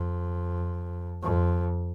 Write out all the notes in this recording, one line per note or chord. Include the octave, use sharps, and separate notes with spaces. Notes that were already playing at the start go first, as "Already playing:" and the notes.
Already playing: F2
F2